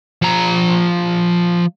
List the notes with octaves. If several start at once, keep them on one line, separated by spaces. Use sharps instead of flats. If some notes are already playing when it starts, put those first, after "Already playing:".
F3 A#5